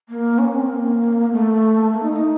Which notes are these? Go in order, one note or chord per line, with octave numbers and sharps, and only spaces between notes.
A#3
C#4
C4
A#3
A3
A#3
D#4
D#4